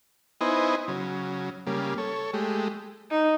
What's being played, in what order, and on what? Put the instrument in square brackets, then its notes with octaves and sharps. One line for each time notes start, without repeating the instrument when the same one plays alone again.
[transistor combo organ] B3 D#4 E4 C5 D#5 G#5
C#3 F#3
C#3 G3 A#3
A4 C#5
G#3 A3 G4
[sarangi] D#4